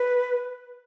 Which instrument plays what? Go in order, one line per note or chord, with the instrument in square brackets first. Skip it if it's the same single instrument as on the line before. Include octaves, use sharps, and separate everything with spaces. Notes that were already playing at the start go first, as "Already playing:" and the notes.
Already playing: [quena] B4